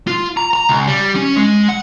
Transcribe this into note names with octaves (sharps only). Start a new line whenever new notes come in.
F4
A#5
A#5
C#2
G3
C#4
G#3
F#5